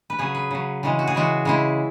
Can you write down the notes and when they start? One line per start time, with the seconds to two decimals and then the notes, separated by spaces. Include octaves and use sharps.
0.10 B4
0.19 C#3 F#3 G#4
0.35 B4
0.51 C#3 F#3
0.83 C#3 E3 G#3
0.99 F#4
1.07 G#4
1.15 C#3 E3 G#3 F#4
1.45 C#3 G#3 E4